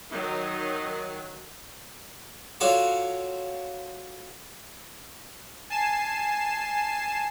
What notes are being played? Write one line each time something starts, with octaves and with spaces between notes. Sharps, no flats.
D#3 F#3 D#4
F4 F#4 A4 C#5 D5
G#5 A5 C7 E7